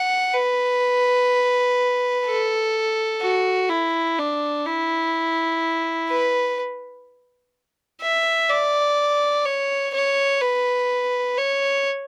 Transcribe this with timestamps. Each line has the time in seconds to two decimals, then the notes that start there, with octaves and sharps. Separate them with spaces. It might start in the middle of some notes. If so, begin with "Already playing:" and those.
Already playing: F#5
0.34 B4
2.26 A4
3.22 F#4
3.69 E4
4.18 D4
4.66 E4
6.10 B4
8.01 E5
8.49 D5
9.46 C#5
9.94 C#5
10.41 B4
11.37 C#5